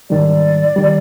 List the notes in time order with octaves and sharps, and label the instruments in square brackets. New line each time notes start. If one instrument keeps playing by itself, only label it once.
[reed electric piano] G#2 D#3 G3 [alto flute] D5
[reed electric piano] D#3 G3